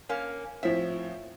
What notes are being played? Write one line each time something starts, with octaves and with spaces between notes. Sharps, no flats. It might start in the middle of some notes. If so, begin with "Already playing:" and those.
A#3 C#4
A2 F3 C4 E5